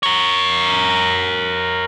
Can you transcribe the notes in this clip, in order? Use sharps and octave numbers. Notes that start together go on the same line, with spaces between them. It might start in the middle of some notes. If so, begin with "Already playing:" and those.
A#4 C#5